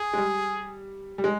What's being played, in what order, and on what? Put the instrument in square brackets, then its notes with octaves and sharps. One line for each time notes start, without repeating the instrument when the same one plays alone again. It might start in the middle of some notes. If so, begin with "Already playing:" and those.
Already playing: [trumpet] G#4
[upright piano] G#3
G3
G3
G#3